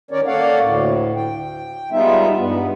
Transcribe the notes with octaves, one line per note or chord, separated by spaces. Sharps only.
D#3 C#4 A#4 C#5 D5
A#3 A4 C#5 D5 F5 F#5
D2 A2
G5
G3 G#3 B3 D#4 F4 E5
G2 B3